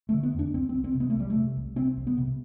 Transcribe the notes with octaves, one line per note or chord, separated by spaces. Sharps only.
A3
D3
B3
E2
D4
C2 C4
C4
C2
C4
C3
B3
A3
C2 G3
A3
C3
C2
C3 C4
C2
B3
C3